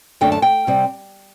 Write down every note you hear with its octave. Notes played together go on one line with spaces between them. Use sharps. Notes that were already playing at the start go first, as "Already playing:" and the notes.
F#2 D3 A3 D4 G5
A5
G5
C3 G3 C4